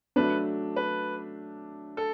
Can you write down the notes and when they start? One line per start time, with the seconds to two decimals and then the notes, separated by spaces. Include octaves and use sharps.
0.16 F#3 A3 D4 B4
0.76 B4
1.97 A4